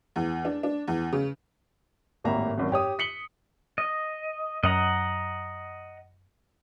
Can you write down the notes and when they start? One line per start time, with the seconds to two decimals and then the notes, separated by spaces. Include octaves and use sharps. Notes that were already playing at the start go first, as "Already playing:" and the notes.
0.16 E2
0.45 D4
0.63 D4
0.88 E2
1.12 C#3
2.24 G#1 A2 A#3 G4 E5 A#5
2.58 G#1 F#2
2.72 G4 C#5 D#6
2.99 B6 C#7 F#7 G7
3.78 D#5
4.63 F#2 D#5 F#5 A#5